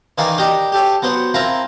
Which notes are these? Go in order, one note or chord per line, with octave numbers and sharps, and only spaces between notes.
D#3 E3 A#4 D5 F5 G#5
D4 G4 A#4 D#5
G4 A4 C#5
F#3 B3 C5 F#5
C4 E4 F4 A#4 A5 A#5